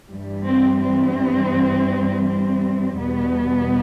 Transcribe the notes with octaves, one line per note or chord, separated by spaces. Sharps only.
G2 E3 G3
C4
C4
C4
E2 B2 G3 B3